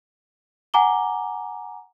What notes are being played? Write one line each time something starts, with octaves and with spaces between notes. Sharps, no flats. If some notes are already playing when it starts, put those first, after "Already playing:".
F#5 G#5 A#5 D6 G7